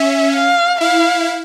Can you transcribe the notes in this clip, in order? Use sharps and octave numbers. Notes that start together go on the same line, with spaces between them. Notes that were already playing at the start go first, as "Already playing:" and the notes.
Already playing: C#4 E5
F5
E4 F5